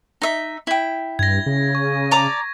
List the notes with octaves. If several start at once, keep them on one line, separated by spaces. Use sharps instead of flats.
D#4 E5
E4 G5
G2 G#6 A#6
C#3
C#6
D5 A#5 D6